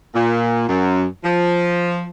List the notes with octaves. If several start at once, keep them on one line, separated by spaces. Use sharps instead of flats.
A#2
F#2
F3